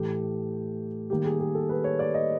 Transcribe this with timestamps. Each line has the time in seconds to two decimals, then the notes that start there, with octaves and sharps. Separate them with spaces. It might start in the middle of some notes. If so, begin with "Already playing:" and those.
Already playing: A2 E3 A3 G4
1.10 D#3 G3 A#3 G4
1.25 G#4
1.40 G#4
1.55 A4
1.69 B4
1.84 C#5
1.99 D5
2.14 D#5